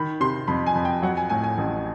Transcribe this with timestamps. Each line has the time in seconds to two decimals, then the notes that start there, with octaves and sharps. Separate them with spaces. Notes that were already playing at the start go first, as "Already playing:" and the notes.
Already playing: D#3 B5
0.20 C3 C6
0.48 F2 B5
0.66 G#5
0.75 F2
0.85 G5
1.02 F#3 F#5
1.17 G#5
1.29 A2 G#5
1.44 G#5
1.58 A1